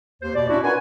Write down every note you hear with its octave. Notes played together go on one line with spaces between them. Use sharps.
D#2 C5
B2 D5
B2 C#4 D4 E4 F#4
F4 A#4 B4 F#5 G#5